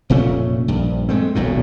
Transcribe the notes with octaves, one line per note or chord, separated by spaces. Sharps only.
F1 A#2 A3 C#4
A#1 G2
G#3 A3 C4
D#1 B1 F#2 A2